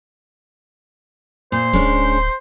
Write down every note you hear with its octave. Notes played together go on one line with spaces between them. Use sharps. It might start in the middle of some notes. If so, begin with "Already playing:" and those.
A#2 C5
D1 G#3 C#4 D4